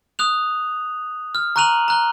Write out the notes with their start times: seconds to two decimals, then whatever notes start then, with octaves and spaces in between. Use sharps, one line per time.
0.19 D#6 F#6 F7
1.35 F6
1.56 A#5 C#6 F#6 D#7 F7 F#7
1.88 A#5 F#6 G7